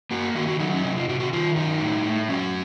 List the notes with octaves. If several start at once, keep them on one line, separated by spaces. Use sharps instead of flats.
A#3 F#4
D#3 F#4
F#4
F#3 D#4
C#4
C3 D#4
F4
C3 F#4
F#4
D#3 F4
F#3 D#4
A2
A2
F#3 C#4